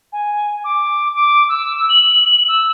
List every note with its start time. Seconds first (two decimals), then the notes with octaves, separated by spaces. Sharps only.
0.13 G#5
0.64 D6
1.14 D6
1.49 E6
1.90 F#7
2.48 E6